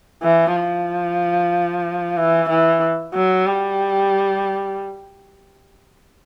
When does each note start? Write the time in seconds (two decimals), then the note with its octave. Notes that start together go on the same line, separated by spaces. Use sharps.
0.23 E3
0.56 F3
2.17 E3
2.50 E3
3.14 F#3
3.47 G3